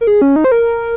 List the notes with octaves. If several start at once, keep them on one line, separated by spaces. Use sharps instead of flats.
A#4
G#4
C#4
D#4
C5
A#4